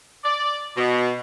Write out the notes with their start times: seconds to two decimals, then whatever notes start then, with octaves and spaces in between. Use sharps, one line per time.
0.24 D5
0.76 B2